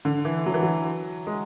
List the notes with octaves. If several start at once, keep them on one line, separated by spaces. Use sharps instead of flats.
D3
E3
F#3
E3
F#3
G#3